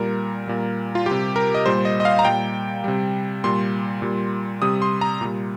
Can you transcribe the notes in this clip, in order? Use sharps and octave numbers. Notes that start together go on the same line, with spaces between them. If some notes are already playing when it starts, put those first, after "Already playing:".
Already playing: A#2 G3 A#4
A#2 G3
F4
C3 G3 G4
A#4
D#5
A#2 G3 C5
D#5
D#5
F5
A#5
A#2 G3 G5
C3 G3
A#2 G3 C6
A#2 G3
C3 G3 D#6
C6
A#5
A#2 G3